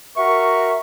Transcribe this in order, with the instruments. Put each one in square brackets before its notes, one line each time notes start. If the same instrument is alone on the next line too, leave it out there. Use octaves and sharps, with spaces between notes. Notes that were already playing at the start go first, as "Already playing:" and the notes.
[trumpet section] F#4 A#4 C#6 [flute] E5